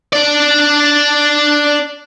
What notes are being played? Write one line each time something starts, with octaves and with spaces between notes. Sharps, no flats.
D4 D5